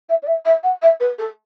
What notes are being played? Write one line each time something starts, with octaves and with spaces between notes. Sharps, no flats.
E5
D5
E5
E5
F#5
E5
B4
A4